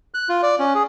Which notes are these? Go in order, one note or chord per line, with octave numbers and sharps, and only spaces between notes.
F#6
F4
D5
C#4
G#4